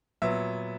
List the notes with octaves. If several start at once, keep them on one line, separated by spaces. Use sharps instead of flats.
A#2 F#3 B3 E5